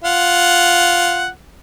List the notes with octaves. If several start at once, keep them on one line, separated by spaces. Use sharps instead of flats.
F4 F#5